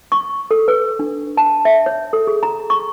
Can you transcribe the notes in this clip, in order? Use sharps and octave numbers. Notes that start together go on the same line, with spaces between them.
C#6
A4
B4
D4
A5
E5
C#5
A4
G#4
A#5
C#6